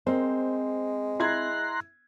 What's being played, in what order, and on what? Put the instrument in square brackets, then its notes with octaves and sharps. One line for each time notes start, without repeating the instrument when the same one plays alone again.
[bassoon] G#3 [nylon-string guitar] C4 [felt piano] A#4 C5
[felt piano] E4 G#6 [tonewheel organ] A#5 C6 F#6